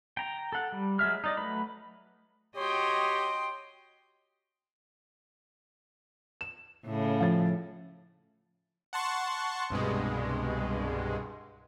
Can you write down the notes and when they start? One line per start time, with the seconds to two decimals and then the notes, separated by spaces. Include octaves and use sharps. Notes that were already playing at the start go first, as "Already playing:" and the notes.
0.17 G5 A#5
0.52 A4 F#5
0.72 G3
0.99 F#3 G#3 E5 F6
1.24 D#4 D5 D#5
1.37 F#3 A3 B4 B5
2.57 F#4 G4 C#5 D#5 G5 C6
6.41 E7
6.86 A2 C#3
7.20 F3 A6
8.93 F#5 A5 C6 C#6
9.70 C2 G2 B2 G#3